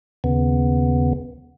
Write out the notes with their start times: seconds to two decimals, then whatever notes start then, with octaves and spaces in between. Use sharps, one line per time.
0.24 D#2 C#3 B3